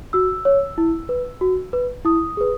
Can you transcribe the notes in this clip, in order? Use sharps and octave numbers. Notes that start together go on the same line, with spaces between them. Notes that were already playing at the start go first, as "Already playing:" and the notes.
F#4 E6
C#5
E4
B4
F#4
B4
E4 D#6
G#4 B4